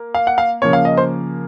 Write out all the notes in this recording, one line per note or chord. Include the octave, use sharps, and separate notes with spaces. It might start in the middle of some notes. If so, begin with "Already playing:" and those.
Already playing: A#3
F5
F#5
F5
C#3 F3 A#3 C#4 C#5
F5
D#5
C5